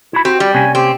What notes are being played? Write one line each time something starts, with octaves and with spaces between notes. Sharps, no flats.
E4 F#4 B5
C4 F#4 G4
G3 D5
C3 A#3 C#4 G#5
C4 G4